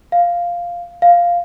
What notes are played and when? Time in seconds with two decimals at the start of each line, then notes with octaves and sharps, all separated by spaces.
0.12 F5
1.02 F5